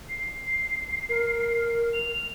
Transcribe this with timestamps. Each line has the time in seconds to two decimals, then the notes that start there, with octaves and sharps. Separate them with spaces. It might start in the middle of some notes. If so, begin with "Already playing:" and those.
0.09 C7
1.09 A#4
1.93 F7